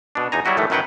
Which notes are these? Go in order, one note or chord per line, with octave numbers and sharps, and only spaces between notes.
B2 D4
E2 D#4 G#5 A#5
F#3 G3 E4 F#4 D#5
A2 D#3 E3 A3
F#2 D#3 F#3 B4 F#5 G5